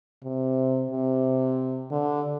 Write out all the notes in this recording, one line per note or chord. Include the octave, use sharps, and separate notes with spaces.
C3
C3
D3